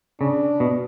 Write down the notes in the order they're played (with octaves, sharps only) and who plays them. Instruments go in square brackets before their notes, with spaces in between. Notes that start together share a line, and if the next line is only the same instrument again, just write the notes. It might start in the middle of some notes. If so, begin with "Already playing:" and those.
[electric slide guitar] C#3 [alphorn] D4
[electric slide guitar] B2